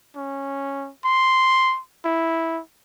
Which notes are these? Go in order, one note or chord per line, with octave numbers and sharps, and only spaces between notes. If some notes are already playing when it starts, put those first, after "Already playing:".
C#4
C6
E4